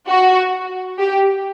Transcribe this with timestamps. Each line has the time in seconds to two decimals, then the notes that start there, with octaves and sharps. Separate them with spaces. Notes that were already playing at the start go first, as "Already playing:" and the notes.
0.09 F#4
0.99 G4